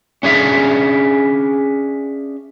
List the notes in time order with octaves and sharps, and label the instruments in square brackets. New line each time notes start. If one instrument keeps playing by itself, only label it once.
[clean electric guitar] C#4 D4 G#4 E5 F5